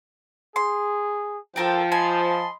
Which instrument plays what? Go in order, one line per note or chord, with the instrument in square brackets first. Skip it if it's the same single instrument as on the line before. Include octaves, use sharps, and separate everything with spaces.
[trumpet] G#4 [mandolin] C6
[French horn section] F3 [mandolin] A4 A#4 D6 [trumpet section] G5
[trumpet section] D#5 B5 C6 [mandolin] G#5 [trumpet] A5